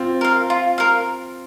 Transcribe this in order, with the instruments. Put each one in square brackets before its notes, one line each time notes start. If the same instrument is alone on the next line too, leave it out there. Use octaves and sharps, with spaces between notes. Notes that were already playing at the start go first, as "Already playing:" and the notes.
Already playing: [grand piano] C4 F4
[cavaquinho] A#4 F5
F4
A#4 F5